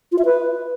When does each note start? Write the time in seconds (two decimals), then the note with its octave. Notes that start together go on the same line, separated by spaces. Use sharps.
0.12 F4
0.18 E5
0.25 B4